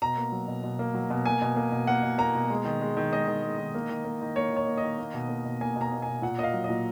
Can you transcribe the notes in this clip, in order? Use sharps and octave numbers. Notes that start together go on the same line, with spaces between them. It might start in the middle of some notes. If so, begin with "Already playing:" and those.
B2 A#5
A#3
F#3
B2
B2
A#3
F#3
B2
A#3 G#5
B2
A#3
B2
A#3 F#5
B2
A#3 A#5
B2
G#3
D#3
G#3
D#3
G#3 D#5
D#3
G#3
D#3
A#3
D#3
A#3
D#3
A#3 C#5
D#3
C#5
A#3
D#5
D#3
A#3
B2
A#3
B2
A#3 G#5
B2
A#5
A#3
B2 G#5
A#2 F#5
A#3 D#5
F5
F#3
A#2 D#5